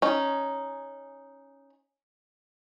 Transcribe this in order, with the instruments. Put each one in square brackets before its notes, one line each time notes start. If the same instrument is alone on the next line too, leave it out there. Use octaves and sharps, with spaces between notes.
[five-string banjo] C#4 D#4